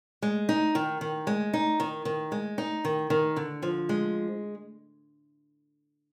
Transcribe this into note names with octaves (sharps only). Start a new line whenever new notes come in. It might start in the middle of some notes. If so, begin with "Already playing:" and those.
G#3
D#4
D#3
D#3
G#3
D#4
D#3
D#3
G#3
D#4
D#3
D#3
D3
F3
G#3